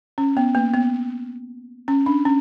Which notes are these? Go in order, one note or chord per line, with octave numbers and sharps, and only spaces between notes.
C#4
B3
A#3
B3
C#4
D4
C#4